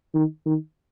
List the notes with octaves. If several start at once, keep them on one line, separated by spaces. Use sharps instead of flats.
D#3
D#3